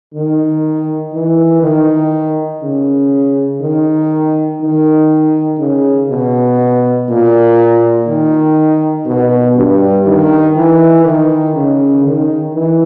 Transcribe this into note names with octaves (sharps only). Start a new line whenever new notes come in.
D#3
E3
D#3
C#3
D#3
D#3
C#3
B2
A#2
D#3
B2
G2
D#3
E3
D#3
C#3
D#3
E3